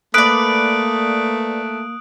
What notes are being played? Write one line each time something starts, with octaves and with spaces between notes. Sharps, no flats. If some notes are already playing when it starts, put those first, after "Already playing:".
A3 A#3 B4 D5 D#6 F#6 D7